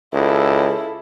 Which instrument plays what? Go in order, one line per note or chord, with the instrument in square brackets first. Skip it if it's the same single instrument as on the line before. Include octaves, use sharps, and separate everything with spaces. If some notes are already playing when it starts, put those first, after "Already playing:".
[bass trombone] C#2 [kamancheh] E4 A4